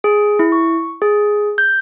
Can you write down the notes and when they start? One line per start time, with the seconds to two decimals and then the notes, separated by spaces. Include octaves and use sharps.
0.04 G#4
0.39 E4
0.52 C#6
1.02 G#4
1.58 G6